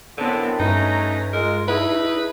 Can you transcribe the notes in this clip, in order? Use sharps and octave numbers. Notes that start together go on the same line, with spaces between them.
F#2 A2 D3 B3 C4 D4
G2 A3 C#4 D#4 B4 A#5
G#3 F4 A#4
D#4 E4 G#4 B4